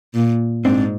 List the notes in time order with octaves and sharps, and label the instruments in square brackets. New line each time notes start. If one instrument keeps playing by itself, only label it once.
[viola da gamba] A#2
[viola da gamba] G#2 [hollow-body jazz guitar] C4 D4